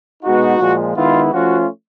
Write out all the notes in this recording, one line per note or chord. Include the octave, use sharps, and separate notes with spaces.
B2 G#3 B3 D#4 F#4
A#2 F3 G#3
D#3 G#3 B3 E4 F4
F3 A3 C#4 F4 F#4